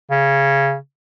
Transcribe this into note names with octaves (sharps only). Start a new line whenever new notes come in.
C#3